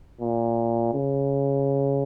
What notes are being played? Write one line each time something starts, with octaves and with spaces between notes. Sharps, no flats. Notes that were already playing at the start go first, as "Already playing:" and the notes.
A#2
C#3